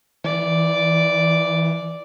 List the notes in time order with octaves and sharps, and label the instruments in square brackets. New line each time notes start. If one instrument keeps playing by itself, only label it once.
[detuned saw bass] E3 [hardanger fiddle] D5